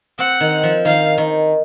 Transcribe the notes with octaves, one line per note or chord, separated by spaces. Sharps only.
C4 F#5
D#3
F3
D#3 F5
D#3